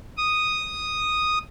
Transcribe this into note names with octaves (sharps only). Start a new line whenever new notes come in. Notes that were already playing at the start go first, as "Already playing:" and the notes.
D#6